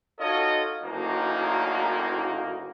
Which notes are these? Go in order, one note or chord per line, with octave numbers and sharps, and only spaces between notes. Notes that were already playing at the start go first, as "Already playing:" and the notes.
D#4 F4 F#4 A4 C#5 D#5
F#1 D2 A#3 D#4